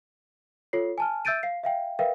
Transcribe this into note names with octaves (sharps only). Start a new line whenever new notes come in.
F4 A4 C#5 C7
G#5 A5 F6
E5 E6 G6 A6 D7 D#7
F5 C7
E5 F5 G5
A#4 B4 E5 F5 G5